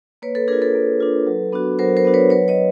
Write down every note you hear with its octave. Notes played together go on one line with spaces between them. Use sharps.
A#3 B4 C#5
A4 B4
D4 F4 G#4 A#4
A4 B4
A#3
D4 F4
F#3
B3 D4 F#4
F#3 A#4 C5
A#4 C5
B3 D4 F#4
B4 C#5
F#3 B4 C#5
C#5 D#5